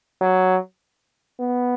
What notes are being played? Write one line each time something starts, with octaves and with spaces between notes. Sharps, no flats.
F#3
B3